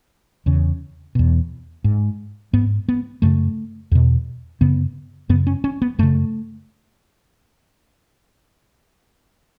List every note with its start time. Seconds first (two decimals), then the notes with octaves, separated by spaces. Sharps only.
0.46 E2 C#3
1.15 E2 B2
1.84 G#2
2.53 G#2 B3
2.89 B3
3.22 F#2 C#3 A3
3.91 E2 B2
4.61 F#2 C#3 B3
5.29 F#2 B3
5.32 C#3
5.47 C#4
5.64 C#4
5.82 B3
5.99 F#2 C#3 A3